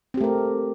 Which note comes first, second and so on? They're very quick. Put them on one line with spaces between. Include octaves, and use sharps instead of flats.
C4 G4 A3 A#4